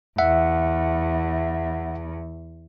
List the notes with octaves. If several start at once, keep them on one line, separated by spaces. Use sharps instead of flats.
E2 E5 F#5